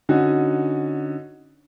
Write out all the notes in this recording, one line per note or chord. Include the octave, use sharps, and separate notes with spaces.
D3 C#4 D#4 F#4